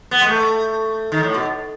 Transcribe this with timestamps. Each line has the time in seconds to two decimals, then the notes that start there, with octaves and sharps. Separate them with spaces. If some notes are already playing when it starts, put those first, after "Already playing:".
0.11 B3
0.21 G#3
0.27 A3
1.12 D#3
1.23 A2
1.34 B2